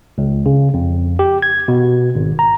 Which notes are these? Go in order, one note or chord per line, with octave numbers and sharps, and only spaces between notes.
C#2
C#3
F2
G4
G#6
B2
G#1
A#5